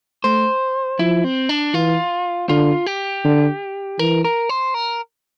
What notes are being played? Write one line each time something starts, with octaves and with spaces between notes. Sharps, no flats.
A3 C5
F3 E4
C4
D4
E3 F4
D3 F4
G4
D3
E3 A#4
A#4
C5
A#4